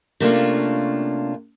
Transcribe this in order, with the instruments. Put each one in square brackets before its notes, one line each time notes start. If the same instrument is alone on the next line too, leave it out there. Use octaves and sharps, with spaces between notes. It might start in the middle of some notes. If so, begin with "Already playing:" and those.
[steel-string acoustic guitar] C3 A3 A#3 C#4 D4 F4